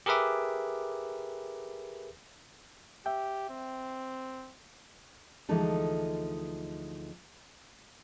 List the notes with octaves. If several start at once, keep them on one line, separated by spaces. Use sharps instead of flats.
G4 G#4 A#4 B4 E5 D6
G4 E5 G5
C4
D2 E3 F3 G#3 D#4 A4